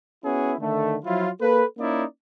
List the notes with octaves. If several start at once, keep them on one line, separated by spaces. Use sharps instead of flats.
B3 C#4 E4 F#4 G#4
D3 D#3 A3
F3 F#3 E4 F4
A#3 A4 B4
A#3 C#4 D#4 E4 D5